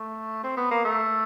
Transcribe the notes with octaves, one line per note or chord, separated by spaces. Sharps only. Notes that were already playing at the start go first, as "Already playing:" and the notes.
Already playing: A3
C4
B3
A#3
A3